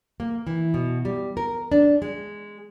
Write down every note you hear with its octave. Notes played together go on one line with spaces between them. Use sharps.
A#3
E3
B2
G3
A#4
D4
G#3